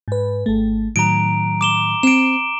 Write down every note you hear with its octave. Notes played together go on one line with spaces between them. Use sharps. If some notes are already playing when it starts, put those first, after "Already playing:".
G#2 B4
G#1 A3
A2 D#3 F#3 A#5 D7
D6 E7 G7
C4 D7 E7